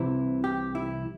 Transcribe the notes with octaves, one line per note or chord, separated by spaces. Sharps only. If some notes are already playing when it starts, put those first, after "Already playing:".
Already playing: C2 C3 E3 E4
G4
E4